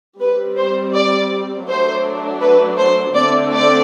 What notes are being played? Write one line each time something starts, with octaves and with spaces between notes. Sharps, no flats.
G3 C4 B4
C5
D5
F#3 A3 D4 C5
B4
C5
D3 A3 C4 D5
D5